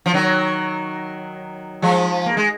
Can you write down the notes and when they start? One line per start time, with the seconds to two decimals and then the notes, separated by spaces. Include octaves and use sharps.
0.06 F3
0.14 D#3 F#3
1.82 F3 G#3
2.26 A#3
2.37 G#3